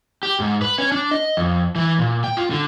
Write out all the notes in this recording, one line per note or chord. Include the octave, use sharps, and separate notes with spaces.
G4
G#2
B4
C#4
D4
D#5
F2
E3
A#2
G5
F4
D3